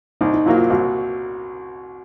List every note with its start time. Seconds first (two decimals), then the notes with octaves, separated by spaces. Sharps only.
0.21 C2 D#4
0.33 D#4
0.46 A#2 F#3 A#3 E4
0.58 F4
0.70 C2 F#4